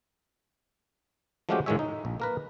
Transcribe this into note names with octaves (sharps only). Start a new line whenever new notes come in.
F3 G#3 A3 C#4 F#4 G4
A2 D#3 F3 G#3 C#5 E5
D#4
A#1
A#3 A#4 B4